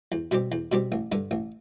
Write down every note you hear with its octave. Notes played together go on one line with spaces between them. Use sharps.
E2
B2 G3 C4 G4
E2
B2 G3 C4 G4
A1
G2 D3
A1